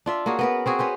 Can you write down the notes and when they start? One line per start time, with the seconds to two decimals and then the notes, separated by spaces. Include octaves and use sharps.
0.06 D4 F4 E5
0.26 A#3 C#4 F#4 G#4
0.39 B3 A#4 B4
0.66 C4 F#4 G#4
0.79 C#4 B4 C5